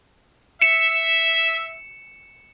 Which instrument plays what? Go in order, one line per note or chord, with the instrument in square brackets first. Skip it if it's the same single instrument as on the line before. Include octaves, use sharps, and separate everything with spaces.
[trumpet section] E5 [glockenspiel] C#7 E7